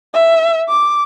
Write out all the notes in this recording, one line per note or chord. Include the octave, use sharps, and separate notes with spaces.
E5
D6